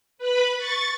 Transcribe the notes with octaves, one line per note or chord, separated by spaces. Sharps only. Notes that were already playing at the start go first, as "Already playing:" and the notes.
B4 B5
C#6 A6